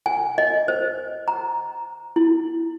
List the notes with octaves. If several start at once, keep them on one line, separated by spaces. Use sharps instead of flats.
G#5
D#5
C5
A#5
E4